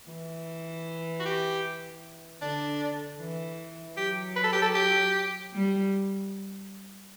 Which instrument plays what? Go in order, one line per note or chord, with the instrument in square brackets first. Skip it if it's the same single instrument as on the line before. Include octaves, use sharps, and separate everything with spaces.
[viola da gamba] E3
[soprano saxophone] F#4
G4
[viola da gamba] D3 [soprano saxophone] D4
[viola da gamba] E3
[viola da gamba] F#3 [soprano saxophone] G4
[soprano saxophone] B4
A4
G4
A4
G4
[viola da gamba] G3